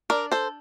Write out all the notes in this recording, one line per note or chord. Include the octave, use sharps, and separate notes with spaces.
D4 A#4 D5
A4 C5